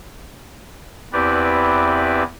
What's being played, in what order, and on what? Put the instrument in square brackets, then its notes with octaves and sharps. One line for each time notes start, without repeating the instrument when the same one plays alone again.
[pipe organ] E2 C4 E4 G4 B4 D5